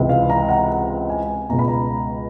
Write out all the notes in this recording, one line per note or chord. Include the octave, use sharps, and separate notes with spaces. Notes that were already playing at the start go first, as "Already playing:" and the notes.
Already playing: C#2 C3 E3
F5
A#5
F#5
G#5
C#2 B2 A#5
B5
A#5